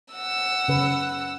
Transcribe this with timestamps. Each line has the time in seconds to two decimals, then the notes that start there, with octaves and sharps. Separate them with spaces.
0.13 F#5 E6
0.68 C#3 B4